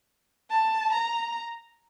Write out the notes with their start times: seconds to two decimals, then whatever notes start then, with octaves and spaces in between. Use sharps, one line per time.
0.50 A5
0.93 A#5